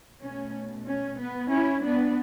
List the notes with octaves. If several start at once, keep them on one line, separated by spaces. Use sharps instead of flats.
B2 A3 C#4
C#4
B3
C#4 E4
B3 D4